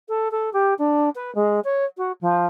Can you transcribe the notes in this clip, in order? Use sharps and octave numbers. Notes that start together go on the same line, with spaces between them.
A4
A4
G4
D4
B4
G#3
C#5
F#4
F3